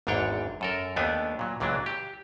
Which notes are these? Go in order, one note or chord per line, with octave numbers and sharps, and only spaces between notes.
G#1 E2 G#2 D4 C#5 G5
F#2 A4 A#4
D#2 A3 B3 D4 G#5
A#2 F#3
C#2 A#2 E3 F#3 D4
G4